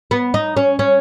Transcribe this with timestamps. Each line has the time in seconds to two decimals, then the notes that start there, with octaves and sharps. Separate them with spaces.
0.11 B3
0.34 D#4
0.57 C#4
0.79 C#4